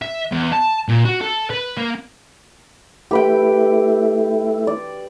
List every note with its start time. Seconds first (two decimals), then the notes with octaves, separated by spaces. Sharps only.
0.02 E5
0.32 E2
0.52 A5
0.89 A#2
1.05 F#4
1.22 A4
1.50 B4
1.77 A#3
3.11 A3 E4 G4 B4 G5
4.67 D5